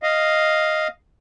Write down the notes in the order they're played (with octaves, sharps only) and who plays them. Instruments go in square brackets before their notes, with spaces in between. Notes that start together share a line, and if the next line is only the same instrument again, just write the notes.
[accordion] D#5 F5